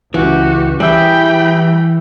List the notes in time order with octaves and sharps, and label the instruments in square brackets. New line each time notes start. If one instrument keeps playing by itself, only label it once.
[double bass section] C#2 [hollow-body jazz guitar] E3 [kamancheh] F#4 G4
[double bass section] E3 [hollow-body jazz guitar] G3 [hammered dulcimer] G#4 E5 [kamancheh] G5 B5